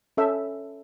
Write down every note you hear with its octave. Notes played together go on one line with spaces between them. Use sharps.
C#4 A4 E5